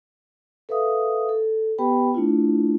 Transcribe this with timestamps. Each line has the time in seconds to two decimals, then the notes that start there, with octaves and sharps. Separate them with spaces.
0.69 A4 B4 E5 F5 D#6
1.29 A4
1.78 B3 G4 B4 G5 B5
2.14 A3 D4 E4 F4